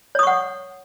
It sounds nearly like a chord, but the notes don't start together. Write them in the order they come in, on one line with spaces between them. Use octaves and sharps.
C#5 D#6 C#6 F#5